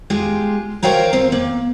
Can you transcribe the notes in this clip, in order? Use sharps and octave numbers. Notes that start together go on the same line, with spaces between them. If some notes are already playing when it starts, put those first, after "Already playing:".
G#3 F4 G4
A#4 C5 C#5 F5 G5 A#5
C4 C5 F5
A#3